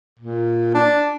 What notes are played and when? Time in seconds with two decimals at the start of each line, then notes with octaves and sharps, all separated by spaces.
0.20 A#2
0.74 D4